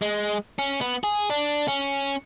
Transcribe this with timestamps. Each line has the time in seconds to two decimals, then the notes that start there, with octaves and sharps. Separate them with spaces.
0.02 G#3
0.59 C#4
0.81 B3
1.04 G#4
1.30 D4
1.68 C#4